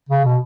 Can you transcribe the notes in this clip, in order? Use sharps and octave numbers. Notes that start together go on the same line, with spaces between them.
C#3
B2